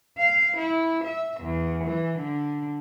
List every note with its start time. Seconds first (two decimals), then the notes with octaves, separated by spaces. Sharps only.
0.17 F5
0.57 E4
1.04 E5
1.41 E2
1.84 E3
2.19 D3